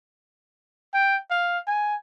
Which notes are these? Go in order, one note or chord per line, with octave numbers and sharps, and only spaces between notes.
G5
F5
G#5